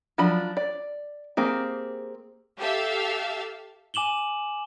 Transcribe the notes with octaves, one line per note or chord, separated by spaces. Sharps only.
F3 F#3 D4 B5
D5
A#3 C4 G4 G#4
G4 A4 E5 F5
G#5 D6 E7 F#7 G7